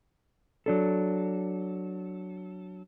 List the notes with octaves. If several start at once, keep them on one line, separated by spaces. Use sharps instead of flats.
F#3 D4 A4